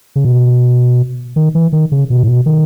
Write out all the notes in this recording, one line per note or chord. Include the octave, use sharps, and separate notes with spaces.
C#3
B2
D#3
E3
D#3
C#3
B2
A2
B2
D#3